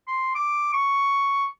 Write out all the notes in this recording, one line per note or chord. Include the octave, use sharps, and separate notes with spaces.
C6
D6
C#6